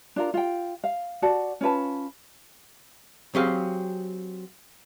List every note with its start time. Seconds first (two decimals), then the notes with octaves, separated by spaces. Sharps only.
0.16 D4 F4 A#4
0.34 F4 G5
0.84 F5
1.22 F#4 D5 F#5 A5
1.61 C#4 F4 B4 A5
3.35 F#3 C4 G4 G#4 F5